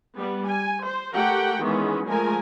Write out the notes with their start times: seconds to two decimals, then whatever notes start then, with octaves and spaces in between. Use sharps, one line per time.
0.16 G3 B3
0.47 G#5
0.84 C5
1.14 A3 G4 A#4 F#5 G5
1.64 D#3 E3 G#3 B3 C#4
2.07 F3 G#3 A3 A#4 G#5